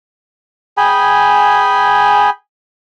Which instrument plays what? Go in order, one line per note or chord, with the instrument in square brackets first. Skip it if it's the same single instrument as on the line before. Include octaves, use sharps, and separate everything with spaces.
[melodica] G#4 G5 G#5 B5